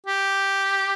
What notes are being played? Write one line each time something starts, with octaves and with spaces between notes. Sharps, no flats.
G4